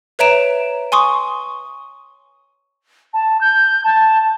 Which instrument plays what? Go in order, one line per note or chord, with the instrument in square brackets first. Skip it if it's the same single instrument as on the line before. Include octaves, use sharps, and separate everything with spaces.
[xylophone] B4 C#5 E5 A#5 D7 E7
G#5 C6 C#6 D#6
[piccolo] A5
G6
A5